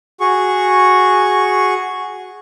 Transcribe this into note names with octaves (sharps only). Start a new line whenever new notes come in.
F#4 G#4 C#6